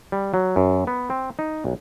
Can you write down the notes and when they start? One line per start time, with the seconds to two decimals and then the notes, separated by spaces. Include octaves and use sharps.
0.12 G3
0.34 F#3
0.56 F#2
0.87 B3
1.10 C4
1.39 D#4
1.65 B1